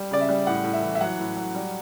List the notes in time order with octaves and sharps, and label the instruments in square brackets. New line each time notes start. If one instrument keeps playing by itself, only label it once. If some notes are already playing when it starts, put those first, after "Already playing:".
Already playing: [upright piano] G3
C#3 D5
E5
G3
A2 F#5
A2
E5
E3
E5
F#3 F#5
A2
F#3
G3